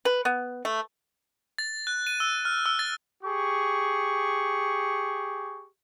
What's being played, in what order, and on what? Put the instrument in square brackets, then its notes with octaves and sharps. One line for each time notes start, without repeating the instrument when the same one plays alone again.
[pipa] B4
B3
A3
[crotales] A6
F#6
D#7
E6
F6
E6
A6
[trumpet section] G4 G#4 C#6